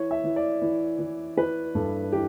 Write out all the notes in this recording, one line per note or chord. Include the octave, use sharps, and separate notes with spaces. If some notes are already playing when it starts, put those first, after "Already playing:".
Already playing: E3 C#5
E5
E3
D5
E3
E3
E3 B4
G2 A4
E3 G4